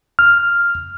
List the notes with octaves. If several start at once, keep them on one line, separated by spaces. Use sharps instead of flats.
F6